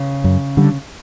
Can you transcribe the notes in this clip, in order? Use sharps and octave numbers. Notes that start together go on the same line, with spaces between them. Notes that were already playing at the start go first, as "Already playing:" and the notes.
Already playing: C#3
F#2
D3 G3